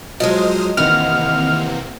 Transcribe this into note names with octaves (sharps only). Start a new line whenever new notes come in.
F3 F#3 G#3 C5 D#5 D#6 F6
C3 D#3 E3 A#3 C4 B4 F#5 F6